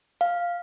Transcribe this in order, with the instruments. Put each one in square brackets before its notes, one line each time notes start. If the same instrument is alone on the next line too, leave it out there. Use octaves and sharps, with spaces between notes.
[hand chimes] F5